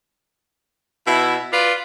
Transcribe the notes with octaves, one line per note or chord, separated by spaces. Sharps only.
B2 E4
F4 B4 D5